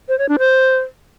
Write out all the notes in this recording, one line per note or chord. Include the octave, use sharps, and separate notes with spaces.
C5
C#5
D4
C5